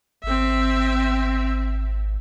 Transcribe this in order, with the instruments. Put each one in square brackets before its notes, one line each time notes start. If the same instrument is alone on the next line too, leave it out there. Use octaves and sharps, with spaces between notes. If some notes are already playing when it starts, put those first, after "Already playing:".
[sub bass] G#1 [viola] C4 E5